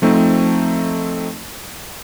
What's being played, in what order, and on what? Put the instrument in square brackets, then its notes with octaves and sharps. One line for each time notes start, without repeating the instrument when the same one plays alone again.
[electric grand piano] F3 A3 C4 D#4